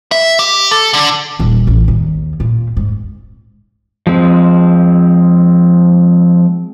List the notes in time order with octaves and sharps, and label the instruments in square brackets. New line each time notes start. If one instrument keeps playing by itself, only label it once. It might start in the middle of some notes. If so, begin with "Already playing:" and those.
[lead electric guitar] E5
G4
A4
D3
[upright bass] D#1
A1
D#2
A#2
G#2
[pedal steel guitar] F3 G#3 C4